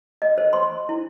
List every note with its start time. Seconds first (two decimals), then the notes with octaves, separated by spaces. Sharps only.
0.22 D#5
0.38 C5
0.53 C6
0.89 E4